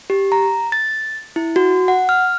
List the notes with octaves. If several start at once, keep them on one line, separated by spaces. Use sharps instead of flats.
G4
A#5
A6
E4
F#4
F#5
F6